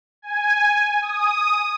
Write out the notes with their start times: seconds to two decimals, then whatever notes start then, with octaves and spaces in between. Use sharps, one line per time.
0.22 G#5
1.02 D#6